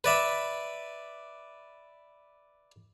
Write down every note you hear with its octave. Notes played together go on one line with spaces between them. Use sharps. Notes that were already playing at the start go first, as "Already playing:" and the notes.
B4 D5 E5